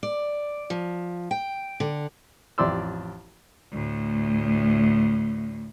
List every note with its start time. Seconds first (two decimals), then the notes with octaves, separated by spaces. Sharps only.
0.03 D5
0.70 F3
1.31 G5
1.80 D3
2.58 A1 F2 G4 D5 C6 E6
3.72 D2 A2